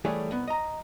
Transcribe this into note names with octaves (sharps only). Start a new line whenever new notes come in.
E3 G3 A3 G#4 A4 C#5
C2 B3
D#5 A#5